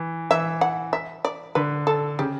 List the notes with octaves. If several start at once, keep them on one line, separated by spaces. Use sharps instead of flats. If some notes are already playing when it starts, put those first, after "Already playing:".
Already playing: E3
E3 E5
F#5
E5
D5
D3 B4
A4
C#3 G4